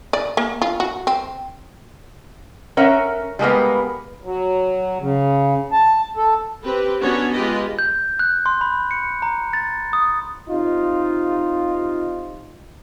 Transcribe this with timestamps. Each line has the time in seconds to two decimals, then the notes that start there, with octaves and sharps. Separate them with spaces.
0.13 D5
0.37 A#3
0.62 F4
0.80 F#4
1.07 C4
2.77 C#4 A#4 E5 F#5
3.39 G3 G#3 A#3 B3
4.24 F#3
5.00 C#3
5.72 A5
6.17 A4
6.62 C4 G4 B4
7.00 F#3 B3 C#4 D4 F#4 C#5
7.33 G#3 F4 G4 B4 D#5
7.79 G6
8.19 F#6
8.46 C6
8.61 B5
8.91 C#7
9.22 A#5
9.53 A6
9.93 D#6
10.50 C3 D#4 F4